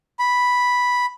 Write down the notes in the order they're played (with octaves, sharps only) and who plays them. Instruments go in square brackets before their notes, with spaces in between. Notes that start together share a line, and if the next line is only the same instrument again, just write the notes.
[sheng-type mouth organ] B5